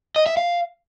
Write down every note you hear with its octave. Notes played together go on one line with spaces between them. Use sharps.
D#5
E5
F5